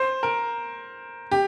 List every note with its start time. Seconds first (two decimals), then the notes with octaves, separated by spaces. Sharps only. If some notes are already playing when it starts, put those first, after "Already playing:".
Already playing: C5
0.23 A#4
1.31 G4